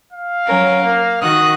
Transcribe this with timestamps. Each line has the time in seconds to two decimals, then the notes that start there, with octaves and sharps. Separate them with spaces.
0.12 F5
0.47 F#3 C#4 A#4
0.83 A#3
1.21 D#3 F#4 D#6 F#6